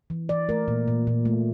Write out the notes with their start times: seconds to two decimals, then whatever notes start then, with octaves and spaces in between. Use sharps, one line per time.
0.10 E3
0.29 E3 D5
0.49 A3 A#4
0.68 A#2
0.88 A#2
1.07 A#2
1.26 A3